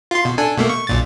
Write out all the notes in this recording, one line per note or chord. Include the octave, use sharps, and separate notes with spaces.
F4 C6
B2
D4 A4 G#5
B2 A3 A#3
C#6
B1 A#2 A6